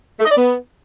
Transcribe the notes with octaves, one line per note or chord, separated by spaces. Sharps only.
A3
D#5
D5
B3